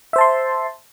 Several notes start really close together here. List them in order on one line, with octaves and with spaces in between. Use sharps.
E5 C5 A5 C6